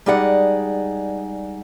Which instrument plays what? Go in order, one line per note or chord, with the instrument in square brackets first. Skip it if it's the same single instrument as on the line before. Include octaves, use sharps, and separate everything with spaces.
[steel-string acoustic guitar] G3 G#3 D#4 G#4 D5 F#5